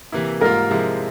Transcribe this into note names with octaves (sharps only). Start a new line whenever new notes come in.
C3 E3 A#3 E4
G#2 G3 A#3 F4 A#4
C3 F3 G#3 E4